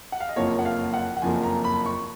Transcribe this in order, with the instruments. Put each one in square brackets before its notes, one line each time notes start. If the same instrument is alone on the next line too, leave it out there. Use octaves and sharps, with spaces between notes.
[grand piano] F#5
F5
D#5
F#1 F2 F3 A#3 C#5
F#5
F5
F#5
F#5
F#1 F2 F3 A#3 G#5
A#5
B5
C#6